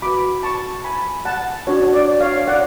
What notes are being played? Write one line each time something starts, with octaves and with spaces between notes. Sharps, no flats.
F#4 B4 B5 D6
A5 C#6
G#5 B5
F#5 A5
D4 F#4 C#5
D5
C#5 F5
D5 F#5